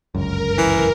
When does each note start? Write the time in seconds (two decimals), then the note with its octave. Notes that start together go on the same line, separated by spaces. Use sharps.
0.15 G1 C#2 F#2 A#4
0.58 E3